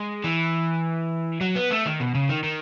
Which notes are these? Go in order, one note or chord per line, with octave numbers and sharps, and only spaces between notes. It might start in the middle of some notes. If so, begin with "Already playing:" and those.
Already playing: G#3
E3
F#3
B3
A3
D#3
B2
C#3
D#3
D#3